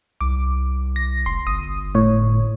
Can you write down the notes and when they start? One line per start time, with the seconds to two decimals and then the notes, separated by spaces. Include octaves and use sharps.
0.21 C2 D6
0.96 A#6
1.26 F1 C6
1.47 G1 D#6
1.95 A2 C#5